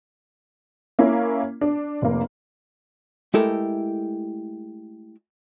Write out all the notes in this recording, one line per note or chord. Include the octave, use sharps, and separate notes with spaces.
A#3 C#4 E4
D4
F1 A#3
G#3 A3 E4 G4 A4 A#4